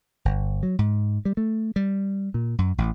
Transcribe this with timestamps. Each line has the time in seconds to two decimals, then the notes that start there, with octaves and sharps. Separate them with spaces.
0.25 G1
0.63 F#3
0.79 G#2
1.25 G3
1.37 A3
1.76 G3
2.34 A#2
2.58 F#2
2.78 A1